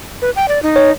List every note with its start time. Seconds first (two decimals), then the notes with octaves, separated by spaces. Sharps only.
0.22 B4
0.36 G5
0.48 D5
0.63 D#4
0.76 C#5